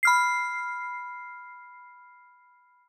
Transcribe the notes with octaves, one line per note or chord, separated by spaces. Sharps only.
B5 F6 C7